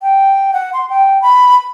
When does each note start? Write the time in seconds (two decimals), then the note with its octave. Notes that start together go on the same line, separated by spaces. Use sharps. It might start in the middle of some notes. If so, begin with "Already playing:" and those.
0.02 G5
0.53 F#5
0.73 C6
0.89 G5
1.22 B5